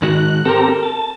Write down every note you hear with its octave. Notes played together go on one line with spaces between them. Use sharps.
G#2 D#3 F#4 F#6
C4 G4 A4 A#4 A#5
A5